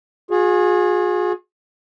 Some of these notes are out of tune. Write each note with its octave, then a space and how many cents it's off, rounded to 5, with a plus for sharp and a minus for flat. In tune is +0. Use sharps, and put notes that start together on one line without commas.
F4 +45 G#4 +0